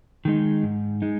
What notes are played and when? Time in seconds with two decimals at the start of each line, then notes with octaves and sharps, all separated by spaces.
0.25 D#3 G#3 D#4
0.63 G#2
1.02 G#3 D#4